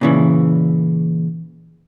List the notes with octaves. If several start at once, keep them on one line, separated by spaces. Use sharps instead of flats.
A#2 C#3 E3